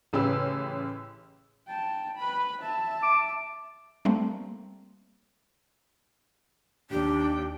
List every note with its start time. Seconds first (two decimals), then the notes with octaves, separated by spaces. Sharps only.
0.13 A1 C#3 C#4 G4 B4 E6
1.67 G5 A5
2.17 B4 B5
2.61 E5 A5
3.03 D6
4.05 G3 A3 A#3 C4
6.90 D#2 D4 G4 G5